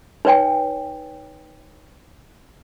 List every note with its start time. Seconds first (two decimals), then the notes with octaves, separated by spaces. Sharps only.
0.25 D#4 B4 C#5 G5 G#5